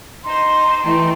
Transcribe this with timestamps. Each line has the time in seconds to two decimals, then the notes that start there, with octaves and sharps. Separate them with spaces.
0.24 D#4 C5 C6
0.84 E3 A3 D#4 G4